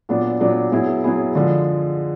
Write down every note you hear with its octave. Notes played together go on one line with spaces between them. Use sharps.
A#2 F#3 B3 D4
A#2 F#3 B3 D4
F#3 B3 E4 G#4
F#3 B3 E4 G#4
D3 F3 G#3